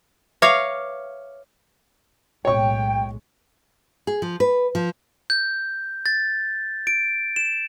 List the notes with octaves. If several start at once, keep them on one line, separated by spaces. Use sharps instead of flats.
B4 C#5 E5 F5 D6
B1 A2 G#3 C#5 G5 C#6
G#4
F3
B4
F3
G6
A6
D7
E7